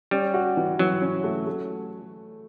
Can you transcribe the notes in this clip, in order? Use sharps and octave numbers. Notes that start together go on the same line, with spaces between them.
G3 C#4
F#4
E3
E3 F#3
C#4
A3
A3